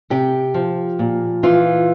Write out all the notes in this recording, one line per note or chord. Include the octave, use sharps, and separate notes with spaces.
C3 G4
F3
A#2
E3 F4